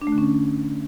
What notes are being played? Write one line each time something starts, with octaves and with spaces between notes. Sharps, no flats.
D4
A3
D3
C#4